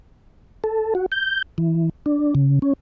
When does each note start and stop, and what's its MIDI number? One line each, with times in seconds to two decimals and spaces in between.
0.64 0.94 69
0.95 1.06 66
1.12 1.42 91
1.58 1.89 52
2.06 2.34 62
2.35 2.59 49
2.62 2.73 61